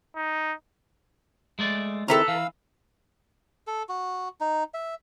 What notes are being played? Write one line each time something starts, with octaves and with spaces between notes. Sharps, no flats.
D#4
G#3 A3 D5
D#3 C4 E4 A4 B4 A#5
E3 F5 E6
A4
F#4
D#4
E5